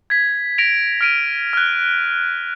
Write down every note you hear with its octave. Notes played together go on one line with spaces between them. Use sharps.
G#6 B6
A#6 D7 F7
F6 D7 D#7
F6 F#6